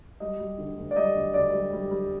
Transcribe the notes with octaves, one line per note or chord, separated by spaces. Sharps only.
G3 D#5
G3
D3
D2
D5
G3 D#5
D2
D2 D5
G3
G3
G3